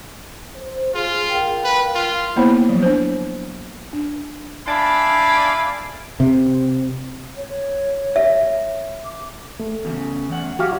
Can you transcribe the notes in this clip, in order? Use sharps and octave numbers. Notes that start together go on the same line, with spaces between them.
C5
F4 G#4
A#4 F5 G5
B4
F4
A#3 B3 E4 C5 C#5
F3 F#3
D4 C5
D4
D4 D5 E5 F5 G#5 B5
C3
C#5
E5
D6
A3
E2 A#2 C#3
E2 F#5
F#3 F#4 G4 F5